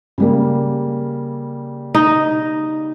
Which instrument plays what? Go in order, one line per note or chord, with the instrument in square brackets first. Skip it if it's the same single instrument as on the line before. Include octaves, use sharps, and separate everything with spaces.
[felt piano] C#3 G3 A#3
[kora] D#4